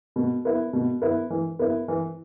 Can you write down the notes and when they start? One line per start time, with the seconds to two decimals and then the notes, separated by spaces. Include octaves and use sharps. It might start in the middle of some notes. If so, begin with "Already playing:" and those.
0.16 B2
0.45 B3 E4
0.73 B2
1.02 B3 E4
1.30 E3
1.59 B3 E4
1.88 E3